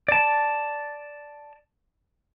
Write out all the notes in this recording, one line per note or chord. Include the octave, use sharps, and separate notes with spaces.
D5 A5